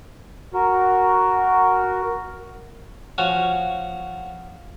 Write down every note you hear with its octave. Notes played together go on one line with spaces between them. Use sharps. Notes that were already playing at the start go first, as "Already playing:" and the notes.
F#4 A#4
F3 C#4 F#4